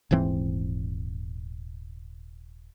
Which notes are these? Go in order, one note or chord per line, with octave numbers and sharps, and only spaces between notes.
D#1 G#2 E3 C4